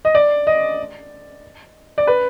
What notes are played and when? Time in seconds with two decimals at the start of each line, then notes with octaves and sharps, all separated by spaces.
0.05 D#5
0.15 D5
0.47 D#5
1.98 D5
2.07 B4